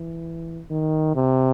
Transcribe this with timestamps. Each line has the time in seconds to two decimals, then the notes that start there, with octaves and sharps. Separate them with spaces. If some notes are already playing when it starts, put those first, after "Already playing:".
Already playing: E3
0.70 D#3
1.15 C3